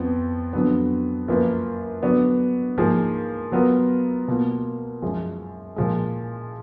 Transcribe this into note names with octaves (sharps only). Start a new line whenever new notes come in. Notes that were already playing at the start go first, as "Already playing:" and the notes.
Already playing: F2 F3 B3
F2 D3 F#3 B3
F#2 F3 A#3 F4 B4
D3 F#3 B3 D4 F#4
G#2 F3 A#3 F4 G#4
F#3 B3 F4 A#4
B2 A#3 F4
F#2 F3 G#3
A#2 F3 G#3